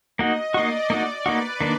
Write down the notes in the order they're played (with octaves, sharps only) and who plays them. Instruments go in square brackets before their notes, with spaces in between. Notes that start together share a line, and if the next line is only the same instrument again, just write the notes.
[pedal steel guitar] A#3 D#4 F#4 [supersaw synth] D#5
[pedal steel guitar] A#3 D#4 F#4 [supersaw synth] D5
[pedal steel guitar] A#3 D#4 F#4
[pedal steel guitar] A#3 D#4 F#4 [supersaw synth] B4
[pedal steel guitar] D#3 A#3 D4